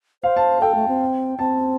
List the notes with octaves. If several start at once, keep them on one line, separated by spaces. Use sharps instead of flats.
C5 F5
A5
A4 G5
A3
C4
C4 A5